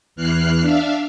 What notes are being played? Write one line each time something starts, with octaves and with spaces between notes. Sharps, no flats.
E2 E3 F6 F#6 C7
D4 E5 F5